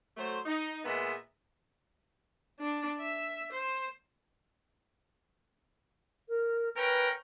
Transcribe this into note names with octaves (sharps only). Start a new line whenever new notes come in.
F#3 A3 C5
D#4
A#2 G#3 B3 B4 D#5 E5
D4
E5
C5
A#4
C#4 A#4 B4 G5